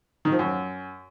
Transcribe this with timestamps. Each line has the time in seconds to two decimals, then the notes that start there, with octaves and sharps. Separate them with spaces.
0.25 D#3
0.32 F3
0.39 F#2